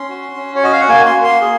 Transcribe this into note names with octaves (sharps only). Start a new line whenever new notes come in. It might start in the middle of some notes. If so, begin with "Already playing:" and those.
Already playing: C#4 C6
F#4
C#4
C#5
F#4 D#5
F5
F#5
A#3 G#5
C6
A#3
C6
G#4